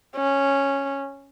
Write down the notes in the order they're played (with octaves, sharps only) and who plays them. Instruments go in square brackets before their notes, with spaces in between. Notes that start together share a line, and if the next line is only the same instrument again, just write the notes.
[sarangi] C#4